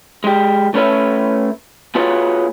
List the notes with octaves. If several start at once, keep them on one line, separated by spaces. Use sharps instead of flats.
G#3 G4
A3 C#4 B4 C#5 E5
A#3 F4 F#4 G#4 B4 C#5